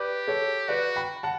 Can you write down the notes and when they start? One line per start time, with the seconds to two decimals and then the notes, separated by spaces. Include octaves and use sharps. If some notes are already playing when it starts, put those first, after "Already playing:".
Already playing: G4 B4 D5
0.28 A4 C#5
0.68 F#4 B4 D5
0.96 G5 B5
1.23 F#5 A5